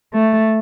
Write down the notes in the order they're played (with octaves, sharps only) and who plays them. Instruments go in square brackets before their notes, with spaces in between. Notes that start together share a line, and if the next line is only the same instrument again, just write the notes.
[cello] A3